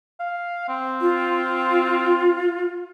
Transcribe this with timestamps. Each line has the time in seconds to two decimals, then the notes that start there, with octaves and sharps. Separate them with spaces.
0.20 F5
0.68 C4
1.01 F4